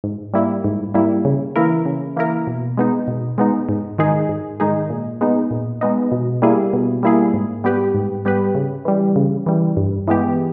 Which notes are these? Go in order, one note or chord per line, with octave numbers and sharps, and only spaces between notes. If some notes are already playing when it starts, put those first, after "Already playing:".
G#2
G3 A#3 E4
G#2
G3 A#3 E4
C#3
E3 A#3 E4 A#4
C#3
E3 A#3 E4 A#4
B2
G#3 B3 D#4
B2
G#3 B3 D#4
G#2
D#3 G#3 D#4 G#4
G#2
D#3 G#3 D#4 G#4
A#2
G#3 B3 D#4
A#2
G#3 B3 D#4
B2
G3 A#3 E4 G#4
B2
G3 A#3 E4 G#4
G#2
G3 B3 G4 B4
G#2
G3 B3 G4 B4
C#3
E3 G3
C#3
E3 G3
G2
E3 G#3 B3 G4